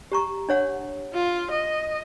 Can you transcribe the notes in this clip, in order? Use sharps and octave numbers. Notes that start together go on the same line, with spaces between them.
G4 A#5 C#6
D4 C#5 F#5
F4
D#5